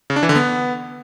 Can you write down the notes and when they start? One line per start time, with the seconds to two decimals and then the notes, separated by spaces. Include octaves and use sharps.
0.10 C#3
0.16 D4
0.23 E3
0.29 D3
0.36 B3